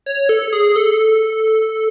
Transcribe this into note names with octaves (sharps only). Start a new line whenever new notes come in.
C#5
A4
G#4
A4